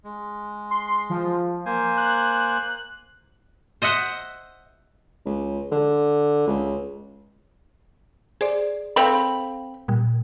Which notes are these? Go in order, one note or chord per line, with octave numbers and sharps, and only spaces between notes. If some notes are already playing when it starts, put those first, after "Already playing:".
G#3
C6
F3
A#3 C5 G#5
F#6
C5 D#5 E5 F#5
C#2
D3
C#2
G#4 C5 D5
C4 A4 F5 B5
A#2 G3